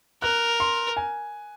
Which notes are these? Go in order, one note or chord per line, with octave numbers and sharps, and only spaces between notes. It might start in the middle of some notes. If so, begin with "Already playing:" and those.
A#4 F#6
C6
G#5